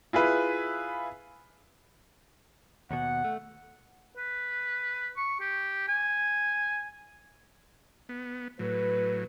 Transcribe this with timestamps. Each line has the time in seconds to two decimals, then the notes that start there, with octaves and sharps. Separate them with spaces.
0.13 E4 F4 G#4 B4
2.91 D#2 B2 F#5
3.24 A3
4.17 B4
5.17 C#6
5.41 G4
5.88 G#5
8.09 B3
8.59 A2 F#3 B4